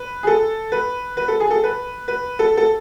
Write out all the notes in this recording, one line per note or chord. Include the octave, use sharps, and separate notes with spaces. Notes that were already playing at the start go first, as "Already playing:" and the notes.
Already playing: B4
G#4
A4
B4
B4
A4
G#4
A4
B4
B4
A4
A4